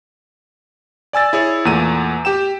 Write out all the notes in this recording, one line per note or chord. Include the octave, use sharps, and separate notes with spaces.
D5 G#5 E6 A6
E4 G#4 C#5
E2 A#2 A3 D#7
G4 G5 E7